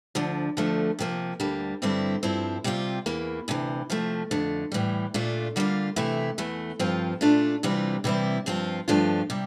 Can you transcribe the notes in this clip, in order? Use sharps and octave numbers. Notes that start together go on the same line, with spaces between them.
D2 D3 F3
D2 D3 F3 A3
C3 F3 A#3
D2 D3 G3 A#3
G2 D3 G3 C4 E4
G2 F3 C4 E4
C3 G3 C4 F4
E2 E3 A#3
D2 C3 E3
C3 F3 A3
F2 D3 A3
A2 E3 G3
A#2 A3 D4 F4
D3 G3 A#3 F4
C3 E3 A3 E4
E2 E3 A3
G2 F3 C4 F4
A#2 A3 D4 F4
C3 E3 G3 C4 F4
C3 E3 G3 C4 E4
G2 F3 C4 F4
G2 F3 A3 D4 F4
C3 G3